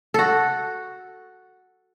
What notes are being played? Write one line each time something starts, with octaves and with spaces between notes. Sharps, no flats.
F#4 A4